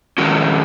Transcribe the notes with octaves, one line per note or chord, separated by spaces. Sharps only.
D#3 G#3 C#4 F#4